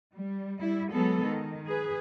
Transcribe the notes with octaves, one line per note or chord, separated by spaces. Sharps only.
G3
G3 E4
F#3 G#3 B3 A4
D#3
G#4 B4